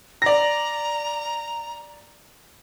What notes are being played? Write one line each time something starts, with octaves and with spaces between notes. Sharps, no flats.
D5 A#5 A#6